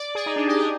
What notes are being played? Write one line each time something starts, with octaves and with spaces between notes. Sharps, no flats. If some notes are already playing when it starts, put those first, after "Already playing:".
Already playing: D5
G#4
D#4
D4
G4
G#4